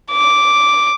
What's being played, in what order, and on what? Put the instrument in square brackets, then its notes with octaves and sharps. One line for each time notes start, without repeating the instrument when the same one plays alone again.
[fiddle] D6